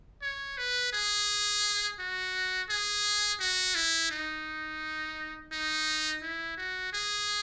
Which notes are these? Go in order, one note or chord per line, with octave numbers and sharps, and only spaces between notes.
C#5
B4
G#4
F#4
G#4
F#4
E4
D#4
D#4
E4
F#4
G#4